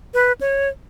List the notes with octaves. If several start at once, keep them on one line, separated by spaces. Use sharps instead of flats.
B4
C#5